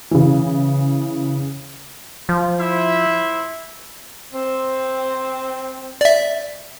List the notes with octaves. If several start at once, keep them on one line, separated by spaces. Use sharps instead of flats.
C#3 E3
F3
E4 C5 E5
C4
D5 E5